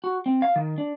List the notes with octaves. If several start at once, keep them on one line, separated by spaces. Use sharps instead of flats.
F#4
C4
F5
D#3
D4